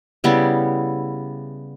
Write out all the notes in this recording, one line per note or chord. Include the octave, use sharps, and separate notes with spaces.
C#3 G3 B3 E4